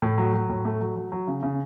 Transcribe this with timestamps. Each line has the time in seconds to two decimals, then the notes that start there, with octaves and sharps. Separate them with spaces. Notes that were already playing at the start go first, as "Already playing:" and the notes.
0.02 A2
0.18 F#3
0.34 F#3
0.49 A2
0.65 A3
0.81 F#3
0.96 F#3
1.12 F#3
1.27 C#3
1.43 C#3